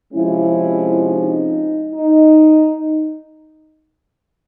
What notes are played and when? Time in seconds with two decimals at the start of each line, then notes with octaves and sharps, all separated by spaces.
0.13 C3 F3 G#3 C#4 E4
1.04 D#4
1.94 D#4